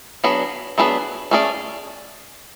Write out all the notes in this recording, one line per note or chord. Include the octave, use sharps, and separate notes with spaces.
F#3 B3 D4 G#4 B4
F#3 B3 D4 G#4 B4
A3 C#4 G#4 B4 D5